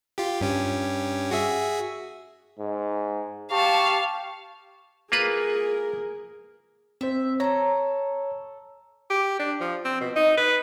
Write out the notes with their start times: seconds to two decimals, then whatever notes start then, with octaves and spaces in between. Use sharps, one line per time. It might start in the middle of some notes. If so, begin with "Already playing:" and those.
0.18 F4 G4
0.41 G2 C#4 G4
1.31 F#4 G#4 E5
2.59 G#2
3.52 G4 F5 A5 C#6
5.12 A#3 F4 G#4 A#4 B4
7.01 C4 C5 E5
7.40 A4 C#5 A#5
9.10 G4
9.39 D4
9.61 F3
9.85 C4
10.01 B2
10.16 D#4
10.37 B4